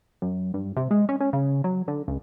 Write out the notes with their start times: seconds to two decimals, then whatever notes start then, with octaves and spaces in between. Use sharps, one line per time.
0.22 F#2
0.54 G2
0.77 C3
0.91 G#3
1.09 C#4
1.21 C#4
1.33 C#3
1.64 F#3
1.88 D3
2.08 C#2